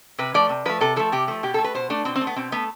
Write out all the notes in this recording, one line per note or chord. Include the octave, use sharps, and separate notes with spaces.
C3 B4
F3 A3 D5
C3
F3 A3 B4
C3 A4
F3 A3 A4
C3 G4
F3 A3
B2 G4
A4
A3
B4
B2 C5
A3 D4
B2 C4
C4
A3
B3
B2 C4
A3 B3